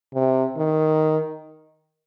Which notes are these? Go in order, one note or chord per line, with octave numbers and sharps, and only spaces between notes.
C3
D#3